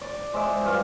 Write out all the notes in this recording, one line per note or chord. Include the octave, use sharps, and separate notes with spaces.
D5
G#3 C5 E5 D6
G2 F3 F5